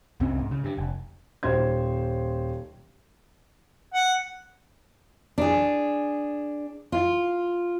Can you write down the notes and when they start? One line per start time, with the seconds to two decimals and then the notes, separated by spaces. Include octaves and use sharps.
0.20 C2 G2 C4 C#4
0.39 G#2
0.51 C#3
0.64 G2
0.78 F1
1.43 D#1 C5 G#6
3.94 F#5
5.38 D4 G#4
6.92 F4